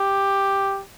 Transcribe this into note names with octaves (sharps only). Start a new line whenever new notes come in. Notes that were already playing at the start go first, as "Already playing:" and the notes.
Already playing: G4